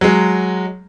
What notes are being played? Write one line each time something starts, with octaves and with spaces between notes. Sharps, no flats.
F#3 G#3